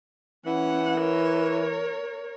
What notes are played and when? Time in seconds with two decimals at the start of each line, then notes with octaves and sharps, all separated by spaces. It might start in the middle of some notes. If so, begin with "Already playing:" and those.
0.46 E3 C#4 F#5
0.99 A#4 C#5